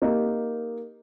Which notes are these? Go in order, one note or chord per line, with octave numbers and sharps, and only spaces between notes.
A#3 D#4 G4